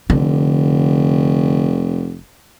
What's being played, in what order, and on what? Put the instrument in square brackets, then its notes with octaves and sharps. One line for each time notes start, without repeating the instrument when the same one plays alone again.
[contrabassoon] F1 [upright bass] D3